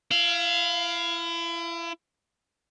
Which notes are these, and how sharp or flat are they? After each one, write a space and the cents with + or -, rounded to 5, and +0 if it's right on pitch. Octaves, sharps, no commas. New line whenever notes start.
E4 +35 F5 +0